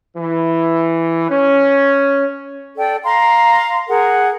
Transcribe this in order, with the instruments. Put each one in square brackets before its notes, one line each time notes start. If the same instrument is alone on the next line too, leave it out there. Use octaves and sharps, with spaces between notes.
[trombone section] E3
C#4
[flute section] A4 D5 G5
F5 A#5 C6
G#4 A#4 F#5